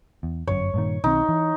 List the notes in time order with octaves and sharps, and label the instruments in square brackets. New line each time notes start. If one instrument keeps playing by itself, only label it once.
[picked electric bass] E2
[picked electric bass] G1 F#2 [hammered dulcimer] C#5
[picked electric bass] G2 A#2 D#3
[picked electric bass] B1 D#3 C4 [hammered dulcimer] D#4
[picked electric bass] E3